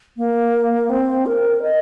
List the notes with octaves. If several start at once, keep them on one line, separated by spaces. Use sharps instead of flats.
A#3
C4
A#4
D#5